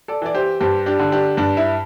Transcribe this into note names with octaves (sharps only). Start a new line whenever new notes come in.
A4 D5
E3 D5
G4 C5
G2 G4 C5
D4 G4
D3
D4 G4
G2 D4
E4